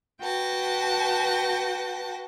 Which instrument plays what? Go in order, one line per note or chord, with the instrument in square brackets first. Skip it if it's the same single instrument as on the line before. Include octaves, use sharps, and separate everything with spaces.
[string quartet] F#4 B4 G5 A5 A#6